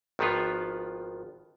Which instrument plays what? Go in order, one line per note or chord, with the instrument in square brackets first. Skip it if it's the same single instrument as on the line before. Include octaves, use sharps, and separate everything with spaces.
[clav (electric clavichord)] G#1 D#3 F3 B3 F4